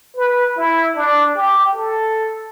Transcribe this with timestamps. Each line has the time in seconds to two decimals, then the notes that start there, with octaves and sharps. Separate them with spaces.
0.16 B4
0.57 E4
0.96 D4
1.36 G4
1.75 A4